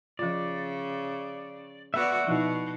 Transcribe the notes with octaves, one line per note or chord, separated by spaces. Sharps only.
C#3 F3 F4 D5
B3 F#4 D5 E5 F#5
B2 F3 D#4 E4